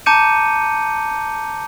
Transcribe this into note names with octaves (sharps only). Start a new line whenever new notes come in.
A5 A#5 D6 G6 C#7 D#7